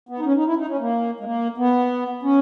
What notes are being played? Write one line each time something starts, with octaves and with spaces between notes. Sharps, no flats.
B3
D#4
C#4
D#4
E4
D#4
C#4
A#3
G#3
A#3
B3
C#4